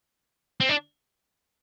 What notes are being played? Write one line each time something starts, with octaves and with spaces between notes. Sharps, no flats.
C4
D4